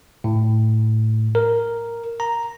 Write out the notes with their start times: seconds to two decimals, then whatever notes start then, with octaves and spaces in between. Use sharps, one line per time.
0.24 A2
1.35 A#4
2.20 A#5